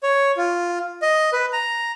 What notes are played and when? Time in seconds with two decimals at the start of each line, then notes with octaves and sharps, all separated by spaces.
0.03 C#5
0.37 F4
1.02 D#5
1.33 B4
1.53 A#5